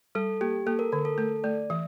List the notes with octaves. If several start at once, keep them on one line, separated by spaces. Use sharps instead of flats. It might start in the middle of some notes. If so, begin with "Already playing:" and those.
G3 A4
A#3 G4
A#3 A4
A#4
D3 A#4
A4
A3 A4
A3 D5
E3 E5